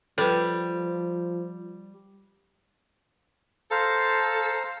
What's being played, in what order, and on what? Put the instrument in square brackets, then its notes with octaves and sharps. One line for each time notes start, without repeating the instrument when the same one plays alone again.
[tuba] F3 [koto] G3 [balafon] A4 B4
[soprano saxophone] A4 [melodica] C5 F5 A#5